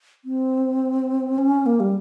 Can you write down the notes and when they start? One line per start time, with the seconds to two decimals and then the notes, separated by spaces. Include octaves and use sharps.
0.25 C4
1.38 C#4
1.66 A#3
1.80 G3